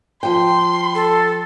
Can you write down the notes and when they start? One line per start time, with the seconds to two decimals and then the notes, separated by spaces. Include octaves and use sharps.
0.23 F3 G5 C6
0.95 A4